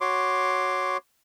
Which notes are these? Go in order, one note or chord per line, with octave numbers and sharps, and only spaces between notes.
F#4 C#5 C6 D6